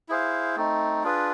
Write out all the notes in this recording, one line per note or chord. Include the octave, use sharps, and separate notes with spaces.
E4 G#4 C5 F5
A3 C4 D#4
D4 F4 G#4 B4